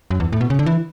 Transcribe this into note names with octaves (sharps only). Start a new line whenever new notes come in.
F#2
E2
A2
B2
C#3
D3
E3